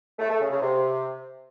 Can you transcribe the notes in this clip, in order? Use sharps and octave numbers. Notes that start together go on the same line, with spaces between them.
A3
A3
C#3
C#3
C3